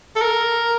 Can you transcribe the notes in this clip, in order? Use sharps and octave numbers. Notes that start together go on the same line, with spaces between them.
A4
A#4